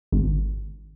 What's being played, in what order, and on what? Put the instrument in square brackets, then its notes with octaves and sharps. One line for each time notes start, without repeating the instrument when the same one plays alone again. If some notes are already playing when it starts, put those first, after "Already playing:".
[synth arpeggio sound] G#1